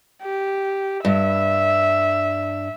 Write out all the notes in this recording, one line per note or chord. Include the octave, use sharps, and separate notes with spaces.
G4
G2 E5